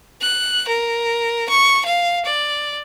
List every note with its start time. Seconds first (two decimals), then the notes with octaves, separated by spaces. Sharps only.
0.22 F#6
0.68 A#4
1.49 C#6
1.86 F5
2.25 D5